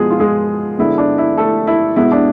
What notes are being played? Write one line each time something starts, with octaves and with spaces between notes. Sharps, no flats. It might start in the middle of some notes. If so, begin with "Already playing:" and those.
Already playing: B2 F3 G#3 B3 G#4
F4
G#3 G#4
D3 G#3 B3 E4
D4
E4
A3 A4
E4
B2 G#3 B3 E4
D4